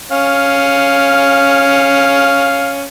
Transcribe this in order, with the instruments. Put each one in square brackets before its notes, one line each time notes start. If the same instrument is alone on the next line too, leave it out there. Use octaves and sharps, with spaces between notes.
[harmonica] C#4 F5